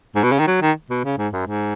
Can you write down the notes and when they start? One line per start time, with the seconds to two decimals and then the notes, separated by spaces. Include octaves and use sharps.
0.15 G#2
0.23 B2
0.32 C#3
0.39 D#3
0.47 F#3
0.62 D#3
0.90 B2
1.04 C#3
1.18 G#2
1.33 F#2
1.47 G#2